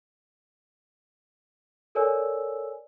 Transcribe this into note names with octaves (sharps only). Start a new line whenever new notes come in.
A4 A#4 C#5 D5 G#5 E6